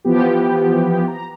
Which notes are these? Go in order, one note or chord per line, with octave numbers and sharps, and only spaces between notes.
E3 F3 B3 G4
A#5